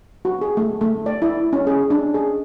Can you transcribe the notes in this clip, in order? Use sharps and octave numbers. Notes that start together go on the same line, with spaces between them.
F#4
G#4
A3
A3
D5
E4
C#4
G#4
D4
G#4